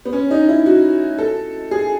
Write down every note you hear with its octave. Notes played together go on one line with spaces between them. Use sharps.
B3
C#4
D#4
E4
F#4
A4
G#4